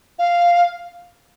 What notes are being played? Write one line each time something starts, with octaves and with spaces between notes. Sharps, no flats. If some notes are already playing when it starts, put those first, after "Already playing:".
F5